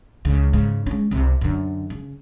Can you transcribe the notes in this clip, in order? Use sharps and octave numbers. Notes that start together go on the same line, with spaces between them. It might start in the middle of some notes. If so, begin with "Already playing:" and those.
C#2 C#3
G#2 C#3
G#3 C#4
C2 C3
F#2 D3
C#3